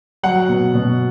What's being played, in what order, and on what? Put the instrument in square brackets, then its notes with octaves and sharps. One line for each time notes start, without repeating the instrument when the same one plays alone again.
[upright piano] F#3 F#5
B2
B2